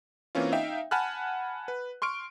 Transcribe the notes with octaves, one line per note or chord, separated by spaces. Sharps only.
E3 A#3 C4 C#4 F4
D#4 E5 F5 G5
F#5 G#5 A5 B5 F6 F#6
B4
C6 C#6 F6 D7